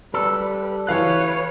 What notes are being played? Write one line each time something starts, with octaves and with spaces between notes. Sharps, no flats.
G3 A4 B4
E3 B4 C#5 F5 F#6